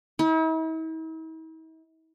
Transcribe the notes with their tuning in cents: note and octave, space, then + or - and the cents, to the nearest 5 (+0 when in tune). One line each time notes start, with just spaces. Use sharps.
E4 -45